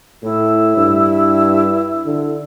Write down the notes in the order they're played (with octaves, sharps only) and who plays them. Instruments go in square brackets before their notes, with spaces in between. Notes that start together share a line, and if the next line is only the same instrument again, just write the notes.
[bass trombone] A2 [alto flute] E4
[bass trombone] G2
D3